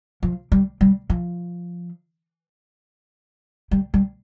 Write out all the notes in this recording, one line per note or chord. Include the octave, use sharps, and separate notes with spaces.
F3
G3
G3
F3
G3
G3